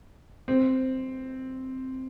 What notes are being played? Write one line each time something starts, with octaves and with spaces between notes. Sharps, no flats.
C4